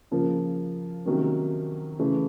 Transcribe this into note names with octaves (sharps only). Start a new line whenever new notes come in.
C#3 F3 A#3
C3 D#3 F#3 A#3 C#4
C#3 E3 A3